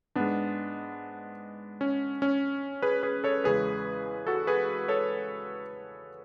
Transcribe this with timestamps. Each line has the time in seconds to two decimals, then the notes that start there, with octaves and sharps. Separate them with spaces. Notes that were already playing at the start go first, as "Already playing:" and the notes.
0.15 G#2 G#3 B3 D4
1.81 C#4
2.22 C#4
2.82 G#4 B4
3.03 G#4 B4
3.24 A4 C#5
3.44 E2 C#3 G#3 G#4 B4
4.27 F#4 A4
4.47 G#4 B4
4.88 A4 C#5